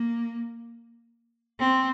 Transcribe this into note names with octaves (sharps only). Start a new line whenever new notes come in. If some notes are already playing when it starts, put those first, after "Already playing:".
Already playing: A#3
C4